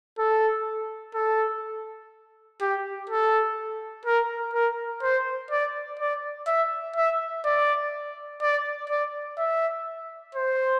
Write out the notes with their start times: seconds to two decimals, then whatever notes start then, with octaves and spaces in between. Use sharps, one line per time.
0.19 A4
1.15 A4
2.61 G4
3.09 A4
4.05 A#4
4.54 A#4
5.02 C5
5.51 D5
5.99 D5
6.47 E5
6.96 E5
7.45 D5
8.42 D5
8.89 D5
9.38 E5
10.35 C5